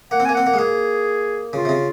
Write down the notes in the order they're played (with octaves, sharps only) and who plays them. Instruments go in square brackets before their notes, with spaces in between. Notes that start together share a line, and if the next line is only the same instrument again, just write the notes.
[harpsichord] A#3 [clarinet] F#5
[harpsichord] C4
[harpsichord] A#3 [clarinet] G#5
[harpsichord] C4 [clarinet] F#5
[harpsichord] A#3
G#3
[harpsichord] A#3 [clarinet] G#4
[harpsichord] C#3 [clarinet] F4
[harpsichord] C3
C#3